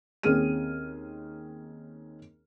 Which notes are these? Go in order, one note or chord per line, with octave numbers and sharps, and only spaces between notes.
D#2 C4 C#4 G#4 F6 D#7